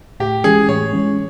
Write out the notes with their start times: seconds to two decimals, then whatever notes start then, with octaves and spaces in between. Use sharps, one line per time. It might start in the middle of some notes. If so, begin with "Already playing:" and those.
0.20 A2 G4
0.44 E3 G#3 C#4 G#4
0.68 A2 C#5
0.93 E3 G#3 C#4